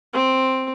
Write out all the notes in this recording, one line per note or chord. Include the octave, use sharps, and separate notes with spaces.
C4